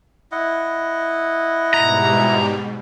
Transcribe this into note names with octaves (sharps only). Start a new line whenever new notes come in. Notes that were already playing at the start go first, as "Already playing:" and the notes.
E4 D#5 F#5
G#2 B2 G3 A#5